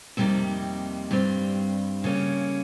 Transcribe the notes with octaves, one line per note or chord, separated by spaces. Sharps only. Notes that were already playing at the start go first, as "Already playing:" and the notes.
F2 C3 G3 A#3 D#4
G2 G3 C4
C#3 G3 A#3 C#4